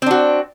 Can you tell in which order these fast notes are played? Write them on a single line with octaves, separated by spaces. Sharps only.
C4 D4 F#4